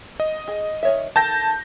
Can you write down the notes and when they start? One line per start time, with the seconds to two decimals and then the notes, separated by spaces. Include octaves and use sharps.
0.20 D#5
0.48 G#4
0.83 D#3 C#5 E5
1.16 D#3 A4 G5 A5 G6 A#6